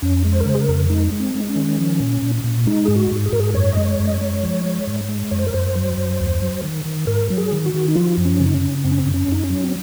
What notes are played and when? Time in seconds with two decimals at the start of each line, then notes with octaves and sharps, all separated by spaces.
0.02 F2 C#4
0.25 G#3
0.32 C5
0.40 A#4
0.46 C#3 C5
0.55 G#4
0.61 A#4
0.68 F2
0.90 G#3 D#4
1.12 G#3
1.20 C4
1.35 G#3
1.49 C#4
1.56 D#3
1.78 F3
2.00 A#2
2.22 A#2
2.44 A#2
2.67 G#3 D#4
2.85 G#2 G#4
2.96 F#4
3.11 G#2
3.26 G#4
3.33 G#2 A#4
3.40 G#4
3.54 F#2 C#5
3.73 G#3 D#5
3.85 C#5
4.00 F#2
4.07 D#5
4.14 C#5
4.21 G#3
4.43 F3
4.65 G#3
4.87 G#2
5.09 G#3
5.31 F#2 C#5
5.39 C5
5.47 A#4
5.53 F#2 C5
5.75 F#3
5.97 F#2
6.20 D#2
6.42 F#3
6.64 D#3
6.85 D#3
7.07 G#2 A#4
7.30 F#3
7.38 G#4
7.51 D#3
7.66 F#4
7.74 D#3
7.88 D#4
7.95 F3 F4
8.17 F#2
8.25 C#4
8.40 C#3
8.46 D#4
8.54 C#4
8.62 C#3
8.84 F#2 C4
8.92 C#4
8.98 C4
9.06 F#2
9.14 C#4
9.28 F#2 D#4
9.43 C#4
9.50 F#3
9.64 C4